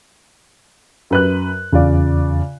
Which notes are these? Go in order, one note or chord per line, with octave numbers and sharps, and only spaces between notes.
F#2 B4 F#6
E2 C#3 F4 D5